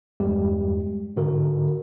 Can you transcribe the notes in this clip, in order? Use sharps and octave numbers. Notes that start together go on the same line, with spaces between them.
E2 G2 G3 G#3 G4
G#2 D3 F#4 A#4